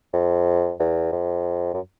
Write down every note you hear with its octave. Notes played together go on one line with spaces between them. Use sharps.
F2
E2
F2
F#2